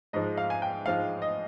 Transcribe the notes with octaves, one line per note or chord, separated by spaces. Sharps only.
G#2 F3 G#3 D#5
F5
G#5
G5
G#2 F3 G#3 F5
D#5